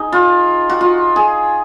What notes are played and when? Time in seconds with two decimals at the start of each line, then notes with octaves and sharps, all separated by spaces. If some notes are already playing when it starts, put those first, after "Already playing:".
Already playing: D#4 G#4
0.12 F4
0.69 F#4
0.81 F4
1.16 G#4